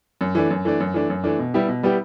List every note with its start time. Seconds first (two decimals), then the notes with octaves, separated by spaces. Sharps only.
0.21 F#2
0.35 E3 A3 D4
0.50 F#2
0.65 E3 A3 D4
0.80 F#2
0.94 E3 A3 D4
1.10 F#2
1.24 E3 A3 D4
1.39 B2
1.54 G3 B3 E4 G4
1.69 B2
1.83 G3 B3 E4 G4